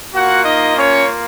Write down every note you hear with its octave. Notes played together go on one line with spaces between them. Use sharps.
A#3 F4 F#4 F#5
D#4 D#5
C#4 C#5